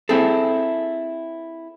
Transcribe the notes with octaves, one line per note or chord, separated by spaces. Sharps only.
C4 E4 G#4 A4